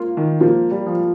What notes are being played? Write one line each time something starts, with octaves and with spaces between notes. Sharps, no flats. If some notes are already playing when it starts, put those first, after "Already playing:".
Already playing: A#3 F4
D#3
F3 A#3
G3
F3